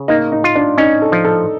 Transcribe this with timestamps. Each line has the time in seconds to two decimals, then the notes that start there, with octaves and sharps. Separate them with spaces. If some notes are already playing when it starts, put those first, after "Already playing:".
Already playing: C#3
0.08 A#3 D#4
0.32 D#4
0.44 F4
0.55 D4
0.78 C#4 D#4
1.02 A4
1.12 F3
1.25 A4